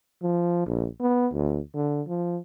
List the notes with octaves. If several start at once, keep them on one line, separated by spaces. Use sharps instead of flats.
F3
A#1
B3
D2
D3
F3